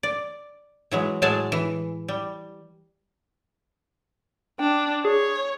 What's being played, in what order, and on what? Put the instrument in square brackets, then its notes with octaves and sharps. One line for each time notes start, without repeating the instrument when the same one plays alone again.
[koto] D5
E3 F#3 G#3
A2 F#3 G#3 G#4 A5
E3
G3
[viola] D4 [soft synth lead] G5
[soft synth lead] G#4 [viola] C#5